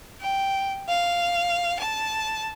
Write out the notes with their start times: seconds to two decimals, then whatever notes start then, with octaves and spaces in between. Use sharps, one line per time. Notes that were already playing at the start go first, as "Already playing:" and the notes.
0.21 G5
0.88 F5
1.78 A5